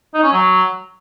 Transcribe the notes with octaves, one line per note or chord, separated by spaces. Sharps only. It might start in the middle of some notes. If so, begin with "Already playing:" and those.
D#4
C#4
F#3